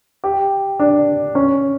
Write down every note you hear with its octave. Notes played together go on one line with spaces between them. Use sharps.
G4
D4
C#4